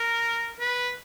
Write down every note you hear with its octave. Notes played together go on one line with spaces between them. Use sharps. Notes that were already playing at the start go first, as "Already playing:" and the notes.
Already playing: A#4
B4